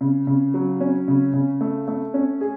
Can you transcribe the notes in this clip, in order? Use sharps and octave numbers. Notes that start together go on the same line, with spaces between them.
C#3
C#3
F#3
C#4
C#3
C#3
A3
A3
C#4
G#4